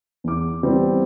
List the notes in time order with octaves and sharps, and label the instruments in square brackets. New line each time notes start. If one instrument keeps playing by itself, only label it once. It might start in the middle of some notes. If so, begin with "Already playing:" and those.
[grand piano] E2 D6
E3 G3 B3 C4